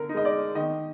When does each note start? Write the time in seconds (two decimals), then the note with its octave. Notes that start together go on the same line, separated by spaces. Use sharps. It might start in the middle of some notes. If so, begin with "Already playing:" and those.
Already playing: D3 A#4
0.09 D#4
0.14 G#3 D#5
0.25 D5
0.55 D#3 D#5